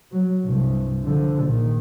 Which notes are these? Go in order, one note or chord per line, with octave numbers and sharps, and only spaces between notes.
F#3
C2 G2
D3 F3
A#1 D#3